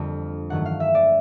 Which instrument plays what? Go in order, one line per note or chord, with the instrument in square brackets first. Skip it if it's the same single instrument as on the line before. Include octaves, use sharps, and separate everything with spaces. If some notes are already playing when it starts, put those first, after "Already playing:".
Already playing: [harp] F2 D3 G3 A#3
G2 D#3 F#3 A3 F#5
F5
E5
D5